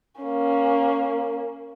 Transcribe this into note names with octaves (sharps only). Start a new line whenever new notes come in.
A#3 C#4